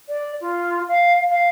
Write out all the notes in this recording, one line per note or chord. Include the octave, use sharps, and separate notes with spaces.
D5
F4
F5
F5